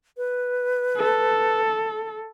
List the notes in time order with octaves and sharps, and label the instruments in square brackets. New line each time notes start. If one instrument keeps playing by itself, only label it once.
[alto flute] B4
[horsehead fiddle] A4